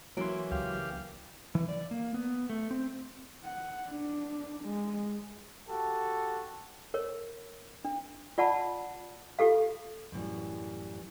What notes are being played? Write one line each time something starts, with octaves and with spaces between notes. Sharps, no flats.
E3 F#3 A#3 C#4 C6 D7
C#2 G4 F5
E3
D5
A#3
B3
A3
C4
F#5
D4
G#3
F#4 G4 A4
A#4 C#5
D4
F4 D5 F#5 A5 B5
F4 G4 A4 F5
F#2 A2 E3 G3